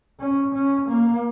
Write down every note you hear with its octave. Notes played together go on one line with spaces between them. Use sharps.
C#4
C#4
A#3